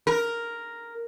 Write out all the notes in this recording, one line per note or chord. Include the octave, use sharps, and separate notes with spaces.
A#4